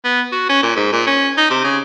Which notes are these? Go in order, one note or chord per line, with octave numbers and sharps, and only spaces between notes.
B3
F#4
C#4
A#2
G#2
A#2
C#4
D#4
C3
C#3